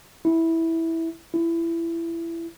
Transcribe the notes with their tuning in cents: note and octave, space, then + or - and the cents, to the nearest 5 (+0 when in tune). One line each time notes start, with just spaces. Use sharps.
E4 -10
E4 +20